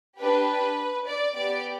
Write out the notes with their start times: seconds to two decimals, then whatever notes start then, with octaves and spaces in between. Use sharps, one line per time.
0.20 D4 G4 B4
1.07 D5
1.36 B3 G4 D5